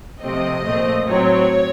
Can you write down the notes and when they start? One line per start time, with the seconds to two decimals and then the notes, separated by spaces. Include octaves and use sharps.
0.22 C3 F3 A3 C4 D#5
0.66 A#2 A3 C4
1.08 A2 F#3 C4 C#5